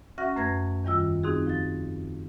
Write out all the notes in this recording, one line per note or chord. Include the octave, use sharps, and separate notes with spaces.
C#4 F#4 E5 F#5 F6 A#6
F#2 A3 B4 G#6 A#6
E2 D#3 G3 F4 E6
C4 D#4 F#4 G#4
F3 A6